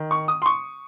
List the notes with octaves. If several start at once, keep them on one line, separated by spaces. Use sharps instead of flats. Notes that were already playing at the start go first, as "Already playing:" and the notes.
Already playing: D#3
C#6
D#6
C6
C#6